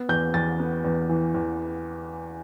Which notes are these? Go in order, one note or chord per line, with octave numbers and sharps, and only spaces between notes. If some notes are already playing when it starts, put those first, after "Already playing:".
Already playing: B3
E2 G6
E2 A6
B3
E2
E3
E2